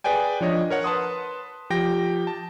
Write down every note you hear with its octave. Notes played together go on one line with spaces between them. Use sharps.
G#4 B4 D5 G5 G#5
F3 D4 C#5 D#5
A#4 C#5 F#5
B4 A5 C6 D#6
F3 G4 G5 A#6
A5